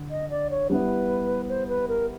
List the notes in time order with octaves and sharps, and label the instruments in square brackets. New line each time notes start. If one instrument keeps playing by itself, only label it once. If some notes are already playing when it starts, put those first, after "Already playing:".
Already playing: [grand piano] D3
[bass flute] D#5
D5
C#5
[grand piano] G3 B3 E4 [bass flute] B4
[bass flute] C5
B4
A#4